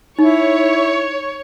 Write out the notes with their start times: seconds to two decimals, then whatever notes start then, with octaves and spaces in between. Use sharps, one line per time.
0.19 D#4 E4 C#5